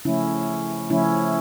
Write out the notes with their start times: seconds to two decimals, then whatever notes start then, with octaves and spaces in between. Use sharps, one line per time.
0.05 C#3 F3 A3 C#4 E4
0.90 C#3 F3 A3 C#4 E4